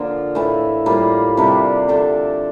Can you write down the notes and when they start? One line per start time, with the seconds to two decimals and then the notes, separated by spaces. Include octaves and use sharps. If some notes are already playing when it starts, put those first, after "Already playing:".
Already playing: D3 F3 A#3 F4
0.35 A2 E3 A3
0.86 A2 G3 A#3 F4
1.37 C3 G3 D4
1.88 D3 A3 D4 A4